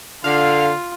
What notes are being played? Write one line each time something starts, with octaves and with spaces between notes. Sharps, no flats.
D3 F4 F5